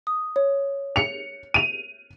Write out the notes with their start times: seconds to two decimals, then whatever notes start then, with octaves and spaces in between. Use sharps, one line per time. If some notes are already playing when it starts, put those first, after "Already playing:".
0.07 D#6
0.36 C#5
0.96 C#7 F7
1.54 D#7 F7